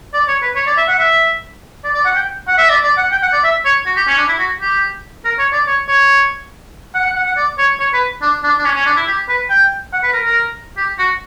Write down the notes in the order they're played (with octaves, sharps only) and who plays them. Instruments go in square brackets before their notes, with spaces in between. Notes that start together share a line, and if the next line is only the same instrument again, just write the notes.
[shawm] D5
C#5
B4
C#5
D5
E5
F#5
E5
D5
D5
F#5
G5
F#5
E5
D5
D5
F#5
G5
F#5
D5
E5
C#5
F#4
G4
C#4
D4
E4
F#4
G4
A#4
C#5
D5
C#5
C#5
F#5
F#5
F#5
F#5
D5
C#5
C#5
B4
D4
D4
D4
C#4
C#4
D4
E4
G4
B4
G5
F#5
B4
A#4
A#4
G4
F#4